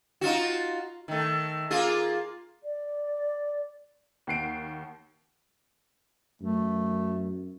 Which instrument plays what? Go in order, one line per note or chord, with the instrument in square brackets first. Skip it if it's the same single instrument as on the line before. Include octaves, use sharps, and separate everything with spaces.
[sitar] D#4 F4 F#4
D#3 A3
A#3 F4 G#4
[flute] D5
[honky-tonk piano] D#2 F#5 C7 D7
[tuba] F#2 [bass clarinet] A3